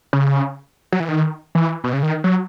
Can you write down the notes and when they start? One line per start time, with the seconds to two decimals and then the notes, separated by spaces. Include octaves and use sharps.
0.13 C#3
0.93 F#3
1.00 E3
1.08 D#3
1.55 E3
1.84 B2
1.93 C#3
2.03 D#3
2.24 F#3